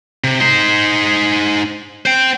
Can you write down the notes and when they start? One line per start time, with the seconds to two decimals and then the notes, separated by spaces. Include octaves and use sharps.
0.24 C3
0.40 D#4 C5
2.06 C5 G5